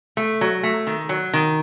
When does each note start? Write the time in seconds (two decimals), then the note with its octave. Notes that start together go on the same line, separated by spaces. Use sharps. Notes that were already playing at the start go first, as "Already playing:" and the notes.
0.17 A3
0.41 F#3
0.63 A3
0.87 D#3
1.09 F#3
1.33 D#3